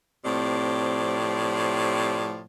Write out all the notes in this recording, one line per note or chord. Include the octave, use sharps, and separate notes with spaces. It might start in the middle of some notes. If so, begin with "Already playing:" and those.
A2 C3 F3 C4 D5